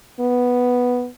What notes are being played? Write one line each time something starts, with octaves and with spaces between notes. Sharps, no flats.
B3